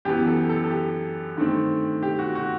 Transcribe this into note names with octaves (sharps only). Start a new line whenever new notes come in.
F#2 E3 B3 G4
A4
A4
A4
G4
G2 D#3 A3 C4
G4
F#4
F#4